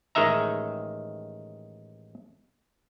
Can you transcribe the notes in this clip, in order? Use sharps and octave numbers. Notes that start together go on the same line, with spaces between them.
A1 D#3 G#3 D#4 E5 A#5